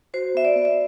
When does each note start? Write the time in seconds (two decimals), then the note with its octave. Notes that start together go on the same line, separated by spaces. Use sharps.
0.14 F#4 C5
0.35 B3 E5
0.45 D5
0.56 B3
0.65 E5